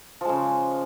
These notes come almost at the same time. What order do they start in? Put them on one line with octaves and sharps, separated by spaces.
F3 G#3 C#3